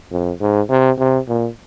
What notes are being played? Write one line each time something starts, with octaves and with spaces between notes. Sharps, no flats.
F2
G#2
C3
C3
A#2